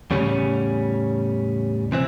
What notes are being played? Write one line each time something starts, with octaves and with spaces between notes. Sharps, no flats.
E2 A2 C#3 G3 C#4
C3 E3 C4